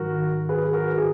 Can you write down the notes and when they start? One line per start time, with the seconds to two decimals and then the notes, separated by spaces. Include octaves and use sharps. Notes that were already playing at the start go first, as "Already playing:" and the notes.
Already playing: G#2 D#3 F#3 F#4 A#4
0.49 G#4 B4
0.65 G#4
0.73 F#4 A#4
0.98 G#4